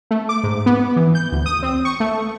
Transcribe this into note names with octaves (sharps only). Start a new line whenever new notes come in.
A3
D6
G#2
B3
E3
G6
D2
D#6
C4
C#6
A3